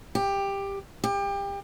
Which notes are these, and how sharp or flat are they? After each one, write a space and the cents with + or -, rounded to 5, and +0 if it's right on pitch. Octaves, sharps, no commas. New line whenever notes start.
G4 +15
G4 +30